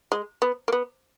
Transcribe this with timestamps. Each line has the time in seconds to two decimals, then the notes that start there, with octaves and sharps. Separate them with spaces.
0.12 G#3
0.42 B3
0.68 A#3
0.72 B3